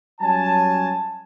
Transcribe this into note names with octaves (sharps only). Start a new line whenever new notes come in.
F#3 G3 C#4 G#5 A5